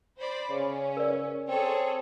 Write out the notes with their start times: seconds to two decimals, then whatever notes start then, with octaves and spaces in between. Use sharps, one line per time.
0.18 C5 D5 B5
0.50 C#3 C#4
0.97 A#4 D5
1.48 C4 G#4 A4 C#5